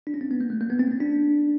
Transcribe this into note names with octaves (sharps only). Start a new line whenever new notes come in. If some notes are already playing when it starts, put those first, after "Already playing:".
D4
C#4
C4
B3
A#3
A3
A#3
B3
C4
C#4
D4